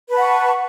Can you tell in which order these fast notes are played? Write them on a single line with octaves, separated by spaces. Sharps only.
B4 A5 F#5 C#6